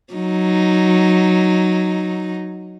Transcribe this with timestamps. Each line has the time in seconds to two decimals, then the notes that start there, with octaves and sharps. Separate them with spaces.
0.14 F#3 D#4